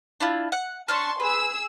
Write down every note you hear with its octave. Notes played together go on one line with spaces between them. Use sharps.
D4 E4 F4
F#5
C#4 D4 A5 C6 C#6 F6
G#4 B4 E6